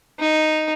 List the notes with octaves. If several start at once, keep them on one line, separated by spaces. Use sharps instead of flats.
D#4